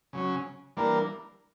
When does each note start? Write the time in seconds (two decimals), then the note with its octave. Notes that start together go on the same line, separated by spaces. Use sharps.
0.13 C#3 F#3 C#4
0.77 E3 G3 A#3 D4 A#4